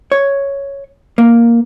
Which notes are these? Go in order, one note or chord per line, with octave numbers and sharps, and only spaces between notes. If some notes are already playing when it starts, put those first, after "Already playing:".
C#5
A#3